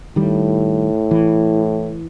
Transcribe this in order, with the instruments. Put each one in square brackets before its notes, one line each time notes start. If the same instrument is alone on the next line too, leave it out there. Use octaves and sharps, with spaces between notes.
[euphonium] A2 [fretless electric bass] D#3 G3
[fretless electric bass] E3